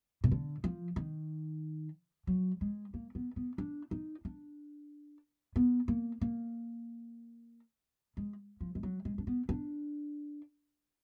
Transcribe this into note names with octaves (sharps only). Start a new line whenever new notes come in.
B2
D3
F3
D#3
F#3
G#3
A#3
B3
B3
D4
D#4
D4
B3
A#3
A#3
G#3
F3
G#3
F#3
G#3
D4
B3
D4